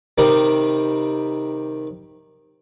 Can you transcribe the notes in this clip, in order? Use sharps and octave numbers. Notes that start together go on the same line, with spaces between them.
C3 D#3 G3